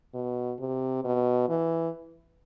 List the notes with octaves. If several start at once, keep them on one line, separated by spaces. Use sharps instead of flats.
B2
C3
B2
E3